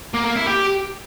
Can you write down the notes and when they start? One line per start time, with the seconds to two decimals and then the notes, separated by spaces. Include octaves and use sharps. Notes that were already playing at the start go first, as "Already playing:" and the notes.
0.14 A#3
0.25 A#3
0.36 E4
0.47 G4